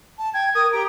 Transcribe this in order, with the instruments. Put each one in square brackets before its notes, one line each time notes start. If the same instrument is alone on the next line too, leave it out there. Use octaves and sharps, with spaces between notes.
[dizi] A5
[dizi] G5 [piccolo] G#6
[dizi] A#4 [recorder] D#6
[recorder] G4 [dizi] A#5 [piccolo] D7